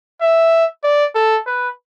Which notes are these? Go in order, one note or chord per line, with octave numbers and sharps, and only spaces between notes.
E5
D5
A4
B4